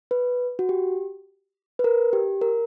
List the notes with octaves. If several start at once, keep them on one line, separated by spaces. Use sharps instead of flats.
B4
F#4
G4
B4
A#4
G4
A#4